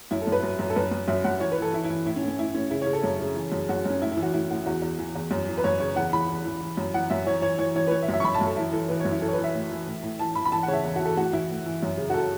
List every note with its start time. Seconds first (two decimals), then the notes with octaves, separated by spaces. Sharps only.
0.11 F#2 E4
0.22 A4
0.27 F#2 B4
0.43 F#2
0.59 F#2
0.70 A4
0.76 F#2 B4
0.92 F#2
1.08 F#2 E5
1.24 F#2 F#5
1.40 E3 C#5
1.52 B4
1.58 E3 A4
1.73 E3 E4
1.84 E4
1.90 E3
2.05 A2 E4
2.16 C#4
2.22 A2
2.28 C#4
2.38 A2 E4
2.54 A2 C#4
2.70 C#3 E4
2.82 C#5
2.87 C#3
2.93 A4
3.04 F#2
3.20 C#3
3.35 E3
3.52 F#2
3.69 F#2 F#4
3.85 F#2 C#4
4.02 A2 E4
4.12 E4
4.17 E3
4.23 F#4
4.33 A2 E4
4.50 A2 F#4
4.66 E2 F#4
4.82 E2
4.98 E3
5.15 E2
5.31 F#2
5.48 E3
5.58 B4
5.64 F#2 C#5
5.80 C#3 C#5
5.96 E2 F#5
6.12 E3 B5
6.29 E3
6.45 E3
6.62 E3
6.77 F#2
6.94 E3 F#5
7.10 F#2 E5
7.26 E3 C#5
7.42 E3 C#5
7.58 E3 C#5
7.75 E3 C#5
7.87 B4
7.91 E3 C#5
8.03 E5
8.08 F#2
8.13 E5
8.20 C#6
8.24 F#2 B5
8.34 A5
8.41 F#2
8.46 A4
8.56 E3 E4
8.73 E3 A4
8.89 E3 B4
9.00 F#2 C#5
9.11 E4
9.22 E3 A4
9.28 C#5
9.33 B4
9.39 E3
9.44 E5
9.55 A2
9.71 E3
9.87 A2
10.02 A2
10.19 E3 A5
10.35 E3 B5
10.45 B5
10.52 E3 A5
10.63 F#5
10.68 C#3 C#5
10.73 E5
10.84 E2
10.96 E3 F#4
11.05 A4
11.17 A2 F#4
11.33 E3 E4
11.50 A2
11.66 E3
11.83 F#2
11.98 C#3
12.10 F#4
12.14 A4